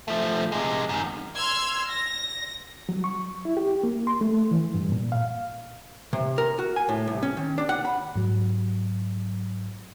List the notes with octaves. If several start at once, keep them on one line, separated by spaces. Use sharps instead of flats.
F3 A3
C3 G#3
F#2 D#3
C6 E6 F6 G#6
A#6
F#3
C#6
E4
G4
A#3
C6
A3
E3
G2
A#2
F5
C3
A#4
F#4
G#5
A2
C2
C#4
D#3
D4
F#5
B5
G#2 F#3